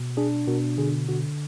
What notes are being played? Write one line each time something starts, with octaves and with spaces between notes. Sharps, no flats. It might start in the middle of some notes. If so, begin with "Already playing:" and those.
Already playing: B2
D4 G#4
B2 F#4 A#4
D3 G#4
D3 F#4